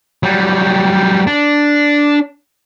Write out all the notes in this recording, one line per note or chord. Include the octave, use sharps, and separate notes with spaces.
F#3 G3
D4